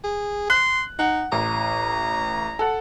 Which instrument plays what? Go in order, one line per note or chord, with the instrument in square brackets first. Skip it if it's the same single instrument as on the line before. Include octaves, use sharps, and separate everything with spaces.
[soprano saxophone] G#4
[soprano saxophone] C6 [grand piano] F#6
[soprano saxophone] D#4 [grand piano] F#5
[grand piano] A1 [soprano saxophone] A#5
[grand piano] A4 F#5